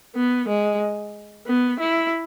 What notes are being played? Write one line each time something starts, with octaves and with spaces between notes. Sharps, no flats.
B3
G#3
B3
E4